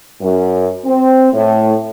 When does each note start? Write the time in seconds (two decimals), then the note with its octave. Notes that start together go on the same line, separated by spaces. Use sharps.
0.21 F#2
0.85 C4
1.33 A2